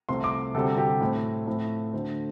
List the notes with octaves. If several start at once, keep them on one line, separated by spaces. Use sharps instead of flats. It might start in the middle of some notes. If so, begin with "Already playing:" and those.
C2 C3 F3 A3 C6
D6
D2 C3 G3 C4 A4
G4
A2 A3 C4
A2 F3 A3 C4
D2 D3 A3 C5